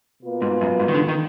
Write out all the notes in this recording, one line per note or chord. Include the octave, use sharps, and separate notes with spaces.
B2 A#3 F4 B4
G#2
F#2
G#2
D#3
D3
D#3